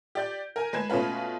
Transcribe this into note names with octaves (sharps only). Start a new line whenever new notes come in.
G4 D5 G6
A#4 G#5
G#3 B4 G#6 E7
B2 A3 C#4 F4 B4